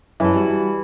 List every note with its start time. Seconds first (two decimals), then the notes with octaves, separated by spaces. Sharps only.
0.20 F#2 E3 A4
0.33 G3 F#4